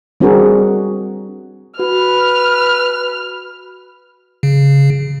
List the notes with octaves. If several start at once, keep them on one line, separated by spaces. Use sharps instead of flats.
G3 C4 D4 F#4 G#4 A#4
F#4 B4 F6
C#3